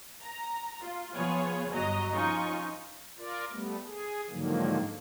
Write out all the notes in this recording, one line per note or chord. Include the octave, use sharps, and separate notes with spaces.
A#5
F4
F3 B3 F4 G#4 C#5
G1 F#3 F#4 D#5 A#5
F3 C#4 D#4 F4 C#6
F4 A#4 D5
G3 A3 B3
G#4
G#2 D3 D#3 F3 F#3 A#3